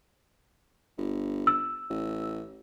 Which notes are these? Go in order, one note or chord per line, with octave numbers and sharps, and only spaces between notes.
G1
E6
A1